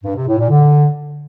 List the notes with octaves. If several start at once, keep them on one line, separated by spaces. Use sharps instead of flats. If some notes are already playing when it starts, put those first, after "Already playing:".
G2
C3
A2
A#2
D3